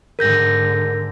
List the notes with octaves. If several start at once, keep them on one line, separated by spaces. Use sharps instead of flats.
G#2 D3 A#4 G6 A#6